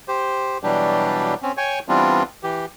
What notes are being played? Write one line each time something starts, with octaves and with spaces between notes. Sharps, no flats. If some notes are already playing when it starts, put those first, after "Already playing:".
G4 C5
B2 E3 F#3 G3 D4 G4
C4 C#4
C#5 G5 G#5 C#6
E3 G3 B3 C4 D4 F4
E3 G4